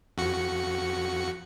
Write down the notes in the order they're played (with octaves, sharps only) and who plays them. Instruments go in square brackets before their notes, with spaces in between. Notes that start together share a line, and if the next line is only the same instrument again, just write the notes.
[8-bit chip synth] F2 F#4 C#7